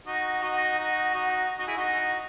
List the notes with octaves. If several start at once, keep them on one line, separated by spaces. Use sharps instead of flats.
D#4 F#4
D#4 F#4
D#4 F#4
D#4 F#4
D#4 F#4
E4 G#4
D#4 F#4